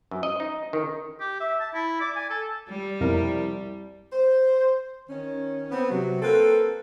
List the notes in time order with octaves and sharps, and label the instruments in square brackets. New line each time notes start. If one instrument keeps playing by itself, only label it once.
[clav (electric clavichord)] F#2
D#5
D#4
D#3
[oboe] G4
E5
A5
E4
D5
G#5
A4
[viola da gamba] G3
[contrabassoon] C2 [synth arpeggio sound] F2 B2 A#4
[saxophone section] C5
D#3 C#4
B3 C4
C3 F#3
A#3 C4 A4 B4